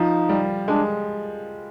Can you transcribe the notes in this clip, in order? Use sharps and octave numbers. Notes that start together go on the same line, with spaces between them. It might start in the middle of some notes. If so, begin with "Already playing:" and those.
Already playing: F3 D#4
G3
G#3 D4